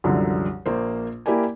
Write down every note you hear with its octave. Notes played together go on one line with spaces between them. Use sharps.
C2 F#2 D3 F3
A#1 A#3 C5
A#3 E4 G4 A#4 D5 G#5